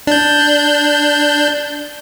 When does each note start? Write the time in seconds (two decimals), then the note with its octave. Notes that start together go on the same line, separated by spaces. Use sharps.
0.07 D4 G6